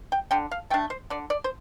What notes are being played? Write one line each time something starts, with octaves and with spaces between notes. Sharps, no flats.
G5
D3 G5
F5
A3 D4 G5
C5
D3 D5
D5
C5